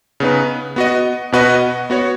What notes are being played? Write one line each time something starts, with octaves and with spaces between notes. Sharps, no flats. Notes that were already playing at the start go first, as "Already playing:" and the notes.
C#3 B3 D#4 B4
B3 F#4 D#5
B2 B3 F#4 B4 D#5
B3 F#4 C#5